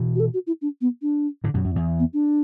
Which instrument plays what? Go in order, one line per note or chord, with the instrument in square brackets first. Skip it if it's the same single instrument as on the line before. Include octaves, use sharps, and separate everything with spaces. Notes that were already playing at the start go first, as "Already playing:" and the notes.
Already playing: [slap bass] B2 E3
[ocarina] F#4
A4
F#4
E4
D4
B3
D4
[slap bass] A2 D3
F#2 B2
F#2
E2
[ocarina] B3
D4